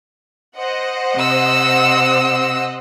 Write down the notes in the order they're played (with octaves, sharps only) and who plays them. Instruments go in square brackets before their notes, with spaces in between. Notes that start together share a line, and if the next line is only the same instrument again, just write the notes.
[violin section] C5 D#5 F#5
[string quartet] C3 E6